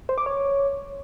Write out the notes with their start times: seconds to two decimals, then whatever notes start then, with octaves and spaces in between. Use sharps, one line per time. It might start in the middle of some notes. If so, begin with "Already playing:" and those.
0.09 C5
0.18 D6
0.26 C#5